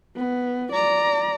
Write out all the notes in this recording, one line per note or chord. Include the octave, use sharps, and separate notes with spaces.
B3
D5 A#5